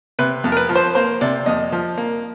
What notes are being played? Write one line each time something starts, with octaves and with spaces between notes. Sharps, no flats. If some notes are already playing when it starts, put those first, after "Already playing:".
C3 B4
F2
A#4
B4
F3
C5
A#3 C5
C3 D5
F2 D#5
F3
A#3